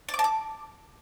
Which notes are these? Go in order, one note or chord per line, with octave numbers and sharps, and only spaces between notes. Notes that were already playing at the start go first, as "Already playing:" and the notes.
D5
D6
A5
D6